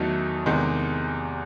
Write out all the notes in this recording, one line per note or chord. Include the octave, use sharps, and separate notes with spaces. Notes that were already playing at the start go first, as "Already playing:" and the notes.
Already playing: E2 D#3 F#3 A3 D#4
E2 C3 D#3 G#3